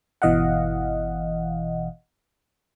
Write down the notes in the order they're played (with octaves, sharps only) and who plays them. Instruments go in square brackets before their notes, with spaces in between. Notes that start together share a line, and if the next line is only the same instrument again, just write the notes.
[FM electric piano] G1 B2 E3 D#5 F5 F#5